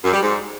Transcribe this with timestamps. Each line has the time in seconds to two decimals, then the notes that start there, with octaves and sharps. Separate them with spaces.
0.04 F#2
0.13 G3
0.22 G#2